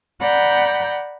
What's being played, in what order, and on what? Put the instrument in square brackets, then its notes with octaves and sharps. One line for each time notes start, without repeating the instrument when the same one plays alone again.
[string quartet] D5 F#5 A#5 B5 G6